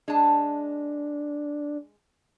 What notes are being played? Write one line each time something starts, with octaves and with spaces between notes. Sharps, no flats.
G#3 D4 A5